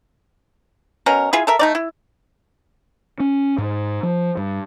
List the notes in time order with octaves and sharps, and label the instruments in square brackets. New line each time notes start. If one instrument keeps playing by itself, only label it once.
[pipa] B2 C#4 A#4
E4 F4 G#4
A4 A#4 E5
A3 D#4 D5
E4
[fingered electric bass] C#4
G#2
F3
G2